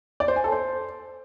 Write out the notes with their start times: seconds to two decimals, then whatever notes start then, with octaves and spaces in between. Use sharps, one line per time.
0.20 D5
0.28 C5
0.36 G#5
0.44 A4
0.52 C5